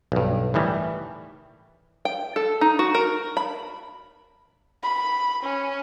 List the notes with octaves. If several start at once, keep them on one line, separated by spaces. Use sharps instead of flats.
B1 G2
A2 D#3 E3 G3
G5
A4
D#4
F#4
A#4
B5
B5
C#4